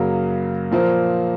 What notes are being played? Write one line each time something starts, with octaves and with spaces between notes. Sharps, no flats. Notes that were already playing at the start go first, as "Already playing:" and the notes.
Already playing: F#2 C#3 F#3 A#3
A#2 F3 A#3